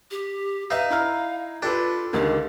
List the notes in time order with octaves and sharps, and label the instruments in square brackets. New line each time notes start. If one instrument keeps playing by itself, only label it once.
[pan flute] G4
[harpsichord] D#4 [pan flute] B4 [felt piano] E5 F5
[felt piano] E4 A#5 F6 [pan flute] F5
[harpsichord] D4 [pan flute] F4 [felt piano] G4 A4 B4
[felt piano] C#2 D3 D#3 [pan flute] G4